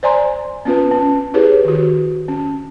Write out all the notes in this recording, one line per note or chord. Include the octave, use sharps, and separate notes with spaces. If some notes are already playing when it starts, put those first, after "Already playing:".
C5 D5 G#5 A#5 C6
B3 C#4 F4 B4
C#4
E4 G4 G#4 A#4 B4 C#5
D#3 F#4
C#4